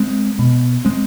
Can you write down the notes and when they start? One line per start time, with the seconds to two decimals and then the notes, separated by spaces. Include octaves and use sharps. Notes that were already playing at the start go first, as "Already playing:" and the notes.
Already playing: G#3 C4
0.39 B2
0.85 G#3 C4